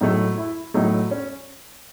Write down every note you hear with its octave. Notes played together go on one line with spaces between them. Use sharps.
A2 F#3 A3 D#4
E4
A2 F#3 A3 D#4
C#4